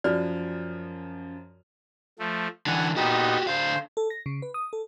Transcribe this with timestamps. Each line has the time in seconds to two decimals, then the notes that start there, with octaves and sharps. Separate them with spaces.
0.04 F#2 F3 F#4 C5 D5 F6
2.19 F3 A3
2.67 D3 E3 F#5 G#5
2.96 A#2 B3 D#4 F#4 G4
3.47 D3 C5 F5
3.97 A4
4.10 A#6
4.26 C#3
4.42 B4
4.54 D#6
4.73 A4